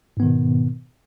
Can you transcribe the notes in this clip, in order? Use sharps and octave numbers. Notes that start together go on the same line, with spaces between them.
G#2 B2 D#3 B3